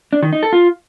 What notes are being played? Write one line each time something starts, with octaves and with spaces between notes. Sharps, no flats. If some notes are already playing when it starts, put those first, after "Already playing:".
D4
D#3
D#4
A4
F4